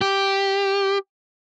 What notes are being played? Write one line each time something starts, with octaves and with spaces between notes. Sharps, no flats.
G4